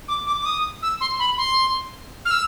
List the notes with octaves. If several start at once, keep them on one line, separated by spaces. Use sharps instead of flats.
D6
D6
D6
D#6
E6
C6
B5
C6
F6
E6